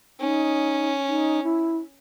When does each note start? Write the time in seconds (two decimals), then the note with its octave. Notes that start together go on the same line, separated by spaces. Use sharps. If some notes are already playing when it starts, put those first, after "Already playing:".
0.20 C#4 D#4
1.08 D#4
1.44 E4